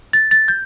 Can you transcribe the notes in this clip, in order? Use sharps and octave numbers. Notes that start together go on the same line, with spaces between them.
A6
A6
G6